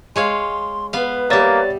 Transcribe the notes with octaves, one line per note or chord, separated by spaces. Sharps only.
G#3 C#5 F5 C6
B3 B4 F5
G3 A#3 C#5 D5 E5 A6